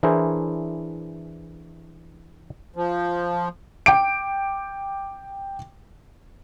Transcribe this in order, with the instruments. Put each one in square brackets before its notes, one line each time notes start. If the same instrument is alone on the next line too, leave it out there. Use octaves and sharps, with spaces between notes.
[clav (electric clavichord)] E3 D4 E4 G#4 A#4 C5
[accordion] F3
[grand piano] G5 D6 D7